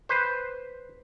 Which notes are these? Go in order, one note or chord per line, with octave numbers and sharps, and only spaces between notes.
B4 C5